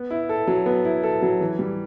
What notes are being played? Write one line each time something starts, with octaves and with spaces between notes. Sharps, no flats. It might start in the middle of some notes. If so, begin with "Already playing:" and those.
Already playing: B3
E4
A4
F#3
B3
E4
A4
F#3
E3
G3